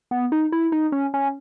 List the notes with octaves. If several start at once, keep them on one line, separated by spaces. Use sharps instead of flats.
B3
D#4
E4
D#4
C#4
C#4